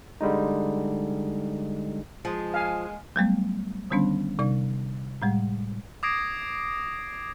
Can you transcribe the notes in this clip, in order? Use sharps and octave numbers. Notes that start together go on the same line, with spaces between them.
D3 G3 G#3 D#4
F3 G#3
F5 G#5
F#3 G3 A3 B3
D3 D#3 G3 B3 C#4 D4
C3 G3 D#4 D5 C#6
A2 G3 G#3
D6 D#6 G#6 A#6 C7 D7